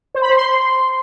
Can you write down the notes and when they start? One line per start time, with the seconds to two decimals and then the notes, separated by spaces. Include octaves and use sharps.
0.15 C5
0.22 B5
0.29 C5
0.37 C6